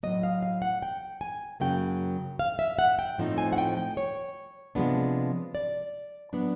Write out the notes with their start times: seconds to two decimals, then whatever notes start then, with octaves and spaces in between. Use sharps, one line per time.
0.03 A2 F#3 A#3 D#5
0.23 F5
0.43 F5
0.62 F#5
0.82 G5
1.21 G#5
1.60 F#2 C#3 F#3 A#3 G5
2.39 F5
2.59 E5
2.79 F#5
2.99 G5
3.18 A2 F3 A3 C4 D#4
3.38 G#5
3.53 F#5
3.58 G5
3.77 G5
3.97 C#5
4.75 C3 F3 G#3 B3 D4
5.55 D5
6.33 A2 F#3 B3 D4